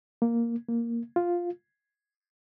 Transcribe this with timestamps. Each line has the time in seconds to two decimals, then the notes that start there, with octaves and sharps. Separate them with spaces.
0.22 A#3
0.69 A#3
1.16 F4